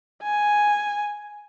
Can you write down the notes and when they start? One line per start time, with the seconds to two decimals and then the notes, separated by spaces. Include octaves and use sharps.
0.23 G#5